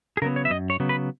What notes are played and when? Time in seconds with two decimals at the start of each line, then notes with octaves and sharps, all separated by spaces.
0.17 G#4
0.22 C#3 F#3 B3 A#4
0.36 C#5
0.45 E5
0.50 F#2 D#5
0.70 C#5
0.80 C#3 F#3 B3
0.89 B4